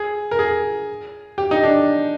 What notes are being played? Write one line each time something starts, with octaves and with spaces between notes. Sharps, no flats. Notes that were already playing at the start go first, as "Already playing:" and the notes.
Already playing: G#4
A#4
G#4
G4
D#4
D4